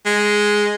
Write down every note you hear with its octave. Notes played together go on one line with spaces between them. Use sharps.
G#3